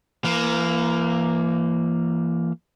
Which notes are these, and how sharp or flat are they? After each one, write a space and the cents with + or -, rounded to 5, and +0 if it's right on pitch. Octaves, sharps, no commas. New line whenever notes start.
E3 +35 A#3 +0